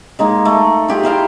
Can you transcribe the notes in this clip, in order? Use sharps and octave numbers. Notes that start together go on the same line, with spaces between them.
G#3 A#3 D#4
A3
F4 G4 G#4
E3 C5 F5 G5